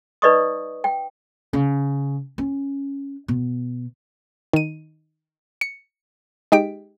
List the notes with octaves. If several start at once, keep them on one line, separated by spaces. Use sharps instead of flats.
D#4 B4 D5 D#5 C#6 D#6
G5
C#3
C#4
B2
D#3 D#7
C#7
G#3 D#4 G4 B6 D7